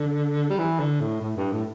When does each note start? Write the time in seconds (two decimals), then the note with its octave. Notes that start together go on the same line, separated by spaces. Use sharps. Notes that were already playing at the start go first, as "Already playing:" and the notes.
Already playing: D3
0.50 G3
0.59 E3
0.80 D3
1.01 A2
1.21 A2
1.37 G2
1.53 A2